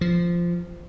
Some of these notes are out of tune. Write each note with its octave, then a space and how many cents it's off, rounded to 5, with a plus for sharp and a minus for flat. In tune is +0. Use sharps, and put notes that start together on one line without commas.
F3 -10